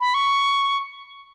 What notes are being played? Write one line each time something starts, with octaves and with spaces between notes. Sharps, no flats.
B5
C#6